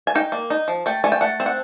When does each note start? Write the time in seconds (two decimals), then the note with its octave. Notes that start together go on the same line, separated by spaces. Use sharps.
0.07 G#5
0.15 D#4 G5
0.32 A#3
0.50 D#4
0.68 F3
0.86 A3 G5
1.04 A3 G#5
1.12 G5
1.21 A3 F#5
1.40 C4
1.46 F#5